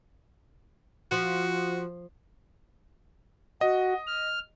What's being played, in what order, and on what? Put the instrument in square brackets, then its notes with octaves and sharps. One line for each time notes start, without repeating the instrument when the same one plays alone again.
[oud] F3 [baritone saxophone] F#4
[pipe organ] F#4 [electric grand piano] D#5
[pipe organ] F6